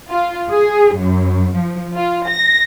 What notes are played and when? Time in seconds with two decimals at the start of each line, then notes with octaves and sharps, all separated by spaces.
0.11 F4
0.50 G#4
0.97 F#2
1.55 F3
1.95 F4
2.28 A#6